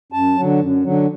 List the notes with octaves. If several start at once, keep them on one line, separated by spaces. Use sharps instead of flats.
F#2 A5
D3 F#3
F#2
D3 F#3